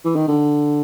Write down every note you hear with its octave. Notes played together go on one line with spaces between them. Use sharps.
E3
D#3
D3